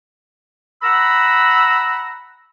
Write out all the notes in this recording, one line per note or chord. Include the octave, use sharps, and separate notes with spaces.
F#5 A#5 B5 E6